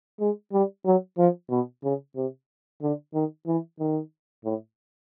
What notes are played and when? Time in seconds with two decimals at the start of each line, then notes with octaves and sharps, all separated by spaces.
0.20 G#3
0.52 G3
0.86 F#3
1.18 F3
1.50 B2
1.84 C#3
2.16 C3
2.82 D3
3.14 D#3
3.47 E3
3.79 D#3
4.45 A2